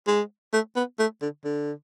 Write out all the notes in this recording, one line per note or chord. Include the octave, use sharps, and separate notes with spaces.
G#3
A3
B3
A3
D3
D3